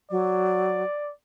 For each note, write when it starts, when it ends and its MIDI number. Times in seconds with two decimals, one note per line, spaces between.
0.11 0.83 54
0.11 1.11 74